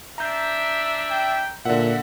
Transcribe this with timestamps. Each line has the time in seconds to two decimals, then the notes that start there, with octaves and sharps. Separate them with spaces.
0.18 D4 E5 A#5 G6
1.10 G5
1.65 A#2 D3 E5 F#5